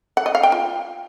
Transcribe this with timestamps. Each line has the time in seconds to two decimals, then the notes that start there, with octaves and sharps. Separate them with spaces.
0.17 F#5
0.26 D#5
0.35 F5
0.43 G5
0.52 F4